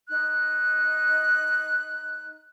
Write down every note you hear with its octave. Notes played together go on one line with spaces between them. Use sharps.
D#4 F#6